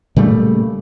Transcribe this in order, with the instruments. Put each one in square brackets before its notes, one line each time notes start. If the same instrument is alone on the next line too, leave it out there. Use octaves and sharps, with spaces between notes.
[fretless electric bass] A#2 C#3 G3 A3